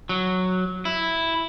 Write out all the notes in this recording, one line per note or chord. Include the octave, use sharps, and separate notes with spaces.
F#3
E4